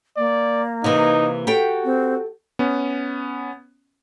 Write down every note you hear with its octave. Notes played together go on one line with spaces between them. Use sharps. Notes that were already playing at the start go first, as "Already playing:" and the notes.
A#3 D5
C3 E3 D#4
F#4 G4 A4 G5
C4
B3 C#4